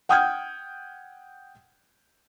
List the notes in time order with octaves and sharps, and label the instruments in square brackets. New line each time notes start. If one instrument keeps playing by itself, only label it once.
[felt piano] F#5 G5 D#6 F6 G6 G#6